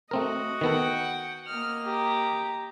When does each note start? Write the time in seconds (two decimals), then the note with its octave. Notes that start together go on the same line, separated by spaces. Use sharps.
0.11 A3 C4 F#4 A#4 D#5
0.61 D#3 B3 A4 F#5 G5
1.47 A#3 D#5 F6
1.86 G4 A#5